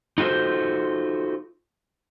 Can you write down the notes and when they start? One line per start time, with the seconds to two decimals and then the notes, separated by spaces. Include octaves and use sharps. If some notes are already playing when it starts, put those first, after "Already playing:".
0.18 D#4 F4 F#4 A4 C5